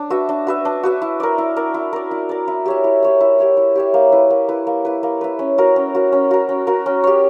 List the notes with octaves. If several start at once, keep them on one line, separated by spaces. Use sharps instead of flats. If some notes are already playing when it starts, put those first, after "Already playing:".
Already playing: D4
F#4 B4 E5
D4
F#4 B4 E5
D4
F#4 B4 E5
E4
A#4 D5
E4
A#4 D5
E4
A#4 D5
E4
A#4 D5
E4
G4 C#5 E5
E4
G4 C#5 E5
E4
G4 C#5 E5
E4
G4 C#5 E5
A#3
E4 B4
A#3
E4 B4
A#3
E4 B4
A#3
E4 B4
C#4
F#4 A#4
C#4
F#4 A#4
C#4
F#4 A#4
C#4
F#4 A#4
C#4
G4 C#5